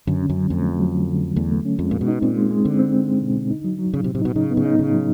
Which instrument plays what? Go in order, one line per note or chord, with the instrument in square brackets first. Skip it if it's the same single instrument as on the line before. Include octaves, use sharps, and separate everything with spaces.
[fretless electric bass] F#2 [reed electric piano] D3
[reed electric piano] C#4
[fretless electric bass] F#2
[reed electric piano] F#3
[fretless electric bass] F2 [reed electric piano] A3
[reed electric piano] A3
F#3
D3
D3
D3
[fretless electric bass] E2 [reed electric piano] A3
[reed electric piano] A3
C#4
[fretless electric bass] F2 [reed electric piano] G#3
[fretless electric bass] A#2 [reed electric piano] G#3
[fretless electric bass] B2
[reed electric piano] D#4
[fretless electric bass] A#2 [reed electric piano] C4
[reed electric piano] G#3
G#3
[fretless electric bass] D3 [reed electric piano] C4
[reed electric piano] C4
C4
G#3
B2
B2
D#4
F#3
F#3
[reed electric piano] A2 [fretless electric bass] C#3
[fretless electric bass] C3
[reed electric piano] A2
[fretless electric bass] C3
[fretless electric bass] B2 [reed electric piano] D#4
[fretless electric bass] C#3 [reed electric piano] D#4
[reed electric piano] B3
[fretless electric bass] C#3
[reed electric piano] D#4
[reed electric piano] A2 [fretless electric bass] C#3
[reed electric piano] F#3